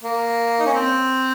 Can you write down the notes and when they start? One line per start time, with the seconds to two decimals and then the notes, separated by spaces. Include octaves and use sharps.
0.04 A#3
0.60 D#4
0.66 C#4
0.74 C4